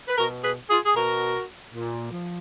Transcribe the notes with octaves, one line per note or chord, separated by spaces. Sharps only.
B4
B2 F#4 A#4
G#4 B4
F4 G#4
G#4
B2 F#4 A#4
A#2
F3